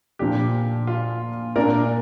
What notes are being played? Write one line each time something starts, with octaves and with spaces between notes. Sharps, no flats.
A#2 F3 D4 G4
F4
A#2 A#3 D4 A#4 D5